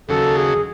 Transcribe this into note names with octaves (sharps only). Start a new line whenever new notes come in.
D#2 C#3 F#3 A4
G#4